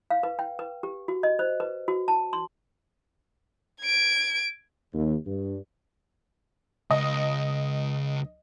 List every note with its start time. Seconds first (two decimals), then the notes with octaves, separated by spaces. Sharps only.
0.10 F5
0.23 B4
0.39 G5
0.59 B4
0.83 G4
1.08 F#4
1.23 D#5
1.39 C5
1.60 B4
1.88 F#4
2.08 A5
2.33 C6
3.82 G#6 D7
4.93 D#2
5.25 G2
6.91 C#2 D#5